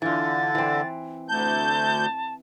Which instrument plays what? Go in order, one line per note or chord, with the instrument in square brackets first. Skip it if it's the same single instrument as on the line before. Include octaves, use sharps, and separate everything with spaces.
[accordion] D3 [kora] E3 F4 [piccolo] A6
[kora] E3 C4
[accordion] D2 G6 [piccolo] A5